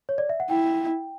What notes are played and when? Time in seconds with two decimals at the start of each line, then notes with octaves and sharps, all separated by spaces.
0.09 C#5
0.18 D5
0.29 E5
0.40 F#5
0.50 E4 G5